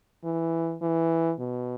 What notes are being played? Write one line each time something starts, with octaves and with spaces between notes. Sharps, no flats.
E3
E3
B2